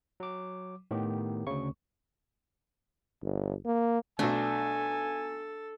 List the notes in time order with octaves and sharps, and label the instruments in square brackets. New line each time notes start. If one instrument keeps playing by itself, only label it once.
[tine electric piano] F#3 D6
[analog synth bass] A2 [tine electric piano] D#3 B3 G4
[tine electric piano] D2 C#6 [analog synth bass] C#3
[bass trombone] G1
A#3
[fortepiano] B1 B2 A3 [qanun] D4 [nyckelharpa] A4 [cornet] G#5